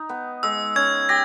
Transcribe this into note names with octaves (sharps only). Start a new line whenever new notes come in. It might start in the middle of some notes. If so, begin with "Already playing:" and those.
Already playing: D#4
B3
G#3 E6
C#4 G#6
G4 A#6